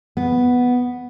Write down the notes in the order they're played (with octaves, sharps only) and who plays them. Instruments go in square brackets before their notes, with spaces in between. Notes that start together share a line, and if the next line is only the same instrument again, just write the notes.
[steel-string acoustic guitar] B3